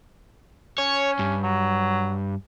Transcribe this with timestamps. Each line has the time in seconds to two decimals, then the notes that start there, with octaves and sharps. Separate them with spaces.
0.78 C#4 C#5
1.19 G2
1.43 F#3